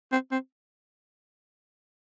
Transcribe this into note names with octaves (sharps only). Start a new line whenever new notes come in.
C4
C4